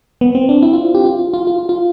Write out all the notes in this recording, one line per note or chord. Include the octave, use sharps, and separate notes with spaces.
B3
C4
D4
E4
F4
G4
F4
F4
F4
F4
F4
F4